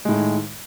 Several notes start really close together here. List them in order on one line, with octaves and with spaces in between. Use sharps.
G#3 A2 D#3